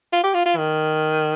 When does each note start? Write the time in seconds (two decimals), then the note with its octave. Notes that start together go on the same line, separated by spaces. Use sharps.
0.13 F4
0.23 G4
0.34 F4
0.45 F4
0.57 D#3